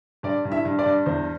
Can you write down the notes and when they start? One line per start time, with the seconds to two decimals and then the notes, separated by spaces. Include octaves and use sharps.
0.23 G2 D5
0.45 G2
0.52 E4 E5
0.65 G2
0.79 D5
0.86 G2
1.06 E2 C5